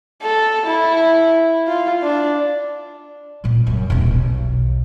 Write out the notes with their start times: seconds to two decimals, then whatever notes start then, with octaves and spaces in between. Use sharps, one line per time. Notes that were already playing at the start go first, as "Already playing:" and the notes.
0.22 A4
0.66 E4
1.68 F4
2.03 D4
3.44 A#2 B3
3.67 F#2 C#3
3.90 D#1 C2
4.06 B1